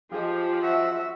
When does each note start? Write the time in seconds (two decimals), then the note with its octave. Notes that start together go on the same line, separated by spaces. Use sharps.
0.12 F3 F4 G4 G#4 D#5
0.62 F#4 E5